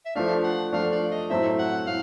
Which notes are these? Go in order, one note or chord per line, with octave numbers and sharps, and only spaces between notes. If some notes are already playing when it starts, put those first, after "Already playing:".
E5
F3 A3 D4 F5
F#5
F3 A3 D4 F5
D5
D#5
A2 F#3 A3 C4 E4 E5
F#5
A2 F5